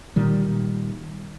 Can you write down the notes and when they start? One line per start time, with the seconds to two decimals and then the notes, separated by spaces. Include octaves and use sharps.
0.16 A#2 D#3 G3